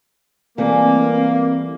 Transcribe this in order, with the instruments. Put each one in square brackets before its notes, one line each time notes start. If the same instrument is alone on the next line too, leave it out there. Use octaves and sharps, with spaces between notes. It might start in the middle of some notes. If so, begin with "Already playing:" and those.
[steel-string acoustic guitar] E3 G3 A3 [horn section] A#3 [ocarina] C4